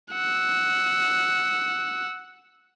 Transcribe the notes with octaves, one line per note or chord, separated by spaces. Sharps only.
F#5 E6